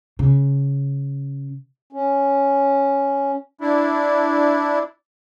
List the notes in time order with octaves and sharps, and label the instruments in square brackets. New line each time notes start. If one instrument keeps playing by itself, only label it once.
[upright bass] C#3
[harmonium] C#4
[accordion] D4 E4